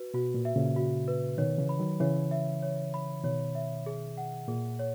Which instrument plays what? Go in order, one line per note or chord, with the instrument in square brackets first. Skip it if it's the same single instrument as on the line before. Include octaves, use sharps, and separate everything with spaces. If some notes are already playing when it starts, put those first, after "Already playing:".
Already playing: [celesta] F#4 B4
[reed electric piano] B2 [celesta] F#4
[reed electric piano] A#2
[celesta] E5
[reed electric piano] A#2 C#3
[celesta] F#4
B4
[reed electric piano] B2 D#3 [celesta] C#5
[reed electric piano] C#3 E3
[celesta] B5
[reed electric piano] D#3 F#3
[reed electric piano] C#3 E3 [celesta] C#5
[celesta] E5
C#5
B5
[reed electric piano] B2 D#3 [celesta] C#5
[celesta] E5
G#4
F#5
[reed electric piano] A#2 [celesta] G#4
[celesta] C#5